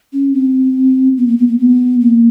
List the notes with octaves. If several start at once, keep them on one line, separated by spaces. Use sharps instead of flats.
C#4
C4
B3
A#3
B3
A#3
B3
A#3